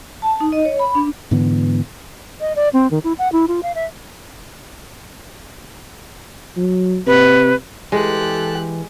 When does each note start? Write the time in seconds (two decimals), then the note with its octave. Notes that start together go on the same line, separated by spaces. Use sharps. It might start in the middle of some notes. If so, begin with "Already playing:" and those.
0.22 A5
0.40 D#4
0.52 D#5
0.65 C#5
0.79 B5
0.95 D4
1.31 G#2 D3 E3 B3
2.41 D#5
2.56 D5
2.73 C4
2.91 D#3
3.04 E4
3.19 F#5
3.33 E4
3.48 F4
3.63 F5
3.75 E5
6.57 F#3
7.07 C3 B4
7.92 E3 G#3 G4 A4 F#6